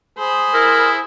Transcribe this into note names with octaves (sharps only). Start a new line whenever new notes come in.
G#4 C5 B5
E4 A#4